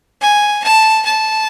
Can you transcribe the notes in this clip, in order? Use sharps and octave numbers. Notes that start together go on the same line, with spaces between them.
G#5
A5
A5